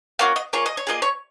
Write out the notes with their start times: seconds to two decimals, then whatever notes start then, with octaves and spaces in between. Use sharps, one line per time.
0.19 A#3 C#4 F#4 F5
0.36 D#5
0.53 A#3 F4 G#4 C#5
0.66 D#5
0.77 C#5
0.87 A#3 F4 G#4 D#5
1.02 C#5